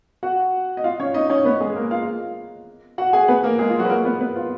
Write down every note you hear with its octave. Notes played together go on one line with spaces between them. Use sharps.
F#4 F#5
D#5
F4 F5
C#4 C#5
D#4 D#5
C#4 C#5
B3 B4
G#3 G#4
A#3 A#4
F4 F5
F#4 F#5
G#4 G#5
B3 B4
A#3 A#4
G#3 G#4
F4
F#3 F#4
B4
A#3 A#4
B3 B4
B3 B4
F4